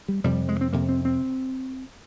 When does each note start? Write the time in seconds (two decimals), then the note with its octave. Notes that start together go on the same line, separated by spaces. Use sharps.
0.08 G3
0.24 F2 C3 G3
0.49 G#3
0.61 C4
0.73 F2 C3 A#3
0.89 C4
1.05 C4